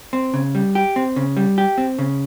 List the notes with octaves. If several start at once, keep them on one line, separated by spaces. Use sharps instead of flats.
C4
C#3
G3
G4
C4
C#3
G3
G4
C4
C#3